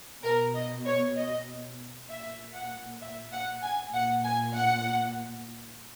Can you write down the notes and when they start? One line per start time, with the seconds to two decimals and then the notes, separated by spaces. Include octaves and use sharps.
0.23 B2 A#4
0.55 D#5
0.86 C#5
1.16 D#5
2.09 A#2 E5
2.54 F#5
3.01 E5
3.32 F#5
3.62 G#5
3.93 A#2 F#5
4.24 G#5
4.56 F#5